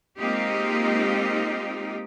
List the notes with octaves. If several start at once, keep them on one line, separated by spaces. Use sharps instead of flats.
G#3 A#3 C4 D#4 F4 G4